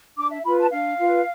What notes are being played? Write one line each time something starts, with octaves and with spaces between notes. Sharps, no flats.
D4 D6
E5
F4 B4 B5
A5
D4 F5
F4 B4